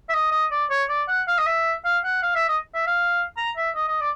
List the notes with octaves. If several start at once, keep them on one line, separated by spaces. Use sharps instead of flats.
E5
D#5
D#5
D5
C#5
D5
F#5
F5
D#5
E5
F5
F#5
F5
E5
D#5
E5
F5
A#5
E5
D#5
D#5
D5